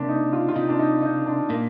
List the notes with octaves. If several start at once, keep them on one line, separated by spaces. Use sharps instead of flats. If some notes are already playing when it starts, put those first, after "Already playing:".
Already playing: C3 A#3 D4
D#4
F4
F4
C3 D#4
D4
D#4
D#4
D4
A#2 A#3